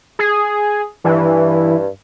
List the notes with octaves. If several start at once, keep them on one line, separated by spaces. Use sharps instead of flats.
G#4
G2 E3